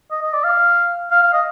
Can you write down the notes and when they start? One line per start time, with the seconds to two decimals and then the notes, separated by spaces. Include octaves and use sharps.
0.11 D#5
0.22 D#5
0.33 D5
0.44 F5
1.11 F5
1.23 F5
1.33 D#5